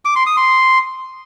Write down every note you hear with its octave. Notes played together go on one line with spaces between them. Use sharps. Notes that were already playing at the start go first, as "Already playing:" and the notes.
D6
C6
D#6
C6